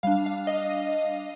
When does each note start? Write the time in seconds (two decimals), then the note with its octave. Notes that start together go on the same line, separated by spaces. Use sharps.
0.03 G3 D4 F5
0.26 F5
0.47 D#5